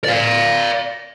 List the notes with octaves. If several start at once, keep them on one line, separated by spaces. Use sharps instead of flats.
D5 F5